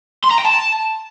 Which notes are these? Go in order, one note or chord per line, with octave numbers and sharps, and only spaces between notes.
C6
A#5
G5
A5